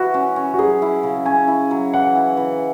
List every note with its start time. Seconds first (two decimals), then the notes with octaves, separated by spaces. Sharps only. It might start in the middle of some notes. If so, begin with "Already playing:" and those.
Already playing: E3 E4 F#4
0.14 C#4
0.36 C#4
0.54 F#4
0.59 F#3 G#4
0.82 E4
1.03 C#3
1.26 C#4 G#5
1.48 E4
1.71 F#3
1.93 E3 F#5
2.15 E4
2.37 E3